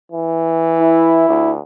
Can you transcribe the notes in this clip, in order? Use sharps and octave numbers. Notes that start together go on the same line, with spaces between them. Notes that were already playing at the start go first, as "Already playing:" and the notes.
E3
E4
D2